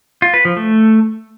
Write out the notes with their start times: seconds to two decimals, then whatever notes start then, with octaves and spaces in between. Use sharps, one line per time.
0.22 F4
0.34 B4
0.45 F3
0.56 A3